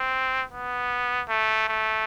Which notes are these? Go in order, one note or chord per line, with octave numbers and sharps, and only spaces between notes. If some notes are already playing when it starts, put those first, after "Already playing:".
Already playing: C4
B3
A3
A3